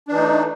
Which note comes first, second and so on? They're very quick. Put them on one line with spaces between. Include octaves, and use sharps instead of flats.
D4 E3 D#4 A3